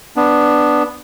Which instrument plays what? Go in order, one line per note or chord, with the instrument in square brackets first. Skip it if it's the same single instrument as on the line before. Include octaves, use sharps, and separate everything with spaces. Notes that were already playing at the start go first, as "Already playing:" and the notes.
[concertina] B3 D4